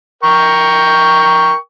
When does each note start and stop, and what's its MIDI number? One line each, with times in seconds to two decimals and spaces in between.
0.23 1.55 70
0.23 1.55 79
0.23 1.55 85